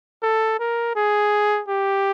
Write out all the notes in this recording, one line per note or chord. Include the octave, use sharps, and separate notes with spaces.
A4
A#4
G#4
G4